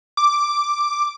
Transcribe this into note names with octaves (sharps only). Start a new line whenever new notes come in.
D6